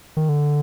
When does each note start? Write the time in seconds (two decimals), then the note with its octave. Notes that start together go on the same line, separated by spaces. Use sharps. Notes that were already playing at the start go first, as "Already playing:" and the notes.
0.17 D#3
0.29 D3